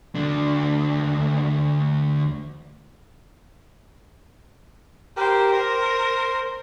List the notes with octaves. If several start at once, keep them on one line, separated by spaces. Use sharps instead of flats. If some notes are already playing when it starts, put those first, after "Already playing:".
D2 D4
G4 A#4 C5
A#4 C5